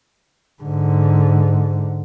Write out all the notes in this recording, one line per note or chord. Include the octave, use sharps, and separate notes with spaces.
G#2 D3